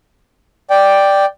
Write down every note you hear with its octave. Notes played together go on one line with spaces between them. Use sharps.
D5 G5